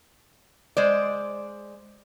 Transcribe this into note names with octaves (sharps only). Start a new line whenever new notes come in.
G#3 C5 D5